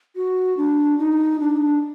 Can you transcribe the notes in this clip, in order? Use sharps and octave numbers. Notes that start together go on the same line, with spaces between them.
F#4
D4
D#4
D4